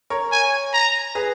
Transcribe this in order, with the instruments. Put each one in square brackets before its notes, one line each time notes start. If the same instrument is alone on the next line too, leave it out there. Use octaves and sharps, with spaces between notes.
[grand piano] A#4 C#5
[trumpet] G#5
A#5
[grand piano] G#4 B4